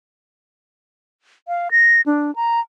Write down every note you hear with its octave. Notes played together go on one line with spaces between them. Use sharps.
F5
A#6
D4
A#5